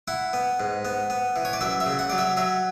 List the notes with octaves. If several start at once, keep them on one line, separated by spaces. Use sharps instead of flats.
E4 F#5
B3
G#2
B3
B3
E3
C#5
D5
F#2 E5
E5
C#3
F#5
F#3 D5
E5
F#3 E5